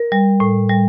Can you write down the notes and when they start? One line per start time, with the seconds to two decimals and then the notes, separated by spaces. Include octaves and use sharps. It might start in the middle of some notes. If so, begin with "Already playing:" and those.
Already playing: A#4
0.12 G3
0.40 A2
0.69 G3